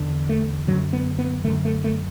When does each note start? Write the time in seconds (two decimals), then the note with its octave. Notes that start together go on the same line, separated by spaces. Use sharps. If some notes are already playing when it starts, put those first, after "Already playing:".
Already playing: E2 D3
0.29 A3
0.67 F#2 D3 F#3
0.93 B3
1.19 B3
1.44 D3 A3
1.48 F#2
1.65 A3
1.84 A3